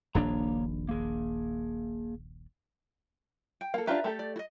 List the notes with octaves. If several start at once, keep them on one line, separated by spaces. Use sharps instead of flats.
D#1 A#1 A#3 D4 C#5 A#5
A#3 G#4
G5
A#3 A4 F5
D4 F4 G4 B4 E5 A#5
A3 G4 A4
D5
E4 D#5